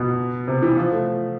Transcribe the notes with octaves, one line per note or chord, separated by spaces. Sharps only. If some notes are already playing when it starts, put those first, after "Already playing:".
Already playing: B2
C3
E3
F3
A3